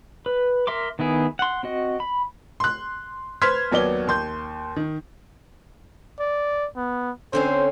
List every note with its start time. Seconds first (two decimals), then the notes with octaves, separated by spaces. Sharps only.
0.26 B4
0.67 A#4 E5 C6 D6
0.99 D#3 B3 E4 G#4
1.39 F#5 C6
1.63 C4 F#4 D#5
2.00 B5
2.60 C6 F#6
3.42 B4 C5 C6 F6 G#6 B6
3.71 D#2 F#3 B3 D5 G7
4.07 D#2 C6 G6
4.76 D#3
6.20 D5
6.77 B3
7.33 D3 C4 C#4 C5